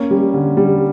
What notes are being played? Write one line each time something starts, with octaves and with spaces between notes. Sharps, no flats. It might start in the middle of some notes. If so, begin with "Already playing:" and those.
Already playing: A#3 C#4
G3
D3
G3